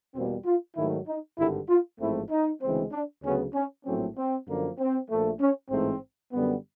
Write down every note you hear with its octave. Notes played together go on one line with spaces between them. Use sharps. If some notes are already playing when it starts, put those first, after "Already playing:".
E2 B2 G3 A#3 C4
F4
G#2 D#3 F#3 A3 E4
D#4
G#1 G2 D3 G3 E4
F4
A1 G#2 F3 A3 C4 E4
D#4
D2 C#3 E3 G#3 C4
D4
D2 C#3 F#3 B3 C#4
C#4
A#1 A2 F#3 A3 C4 C#4
C4
F#2 D3 F3 A#3
C4
A#1 A#2 F3 A3
C#4
A1 G#2 E3 A3 C4
F#2 D3 G3 B3